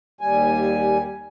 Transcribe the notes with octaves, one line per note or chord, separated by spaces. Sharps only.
D#2 G3 G#5